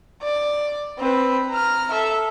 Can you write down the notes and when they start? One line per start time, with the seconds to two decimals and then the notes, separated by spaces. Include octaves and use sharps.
0.22 D5
0.99 C4 B4
1.50 A#5 F6
1.91 A4 E5